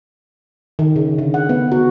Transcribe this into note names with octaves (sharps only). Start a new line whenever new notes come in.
D#3
C#3
D3
F#5
B3
F#4